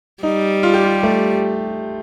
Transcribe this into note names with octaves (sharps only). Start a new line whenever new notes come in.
G3 D#4
F4
G4
F4
A3